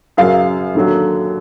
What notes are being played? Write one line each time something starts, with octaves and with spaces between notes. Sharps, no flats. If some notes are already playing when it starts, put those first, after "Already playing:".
F#2 C#3 F#3 F5
D#2 D3 F#3